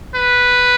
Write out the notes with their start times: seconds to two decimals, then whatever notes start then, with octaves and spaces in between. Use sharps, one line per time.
0.15 B4